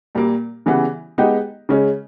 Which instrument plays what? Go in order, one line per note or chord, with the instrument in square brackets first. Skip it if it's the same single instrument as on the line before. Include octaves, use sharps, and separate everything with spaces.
[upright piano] A#2 G3 A#3
C#3 E3 G3 B3
G#3 B3 D#4 G4
C#3 G#3 C#4